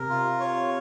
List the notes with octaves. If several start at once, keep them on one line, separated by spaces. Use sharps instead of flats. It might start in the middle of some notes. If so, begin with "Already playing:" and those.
Already playing: C3 A#4
F4
C#5